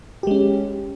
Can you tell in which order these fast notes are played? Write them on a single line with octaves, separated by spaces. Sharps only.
G4 G#3 C#4